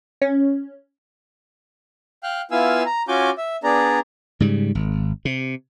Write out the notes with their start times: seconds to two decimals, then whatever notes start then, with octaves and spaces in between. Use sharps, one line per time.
0.22 C#4
2.23 F5 G5 F6 F#6
2.51 B3 E4 F4 F5 G#5 E6
2.86 A#5
3.08 C#4 F4 F#4 G#5 D6 G6
3.38 E5
3.64 B3 D4 G#4 D5 A#5
4.40 G#2 C#3 G3
4.75 G#1
5.25 C3